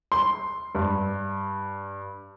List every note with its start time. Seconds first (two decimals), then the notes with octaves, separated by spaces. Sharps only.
0.12 C6
0.75 G2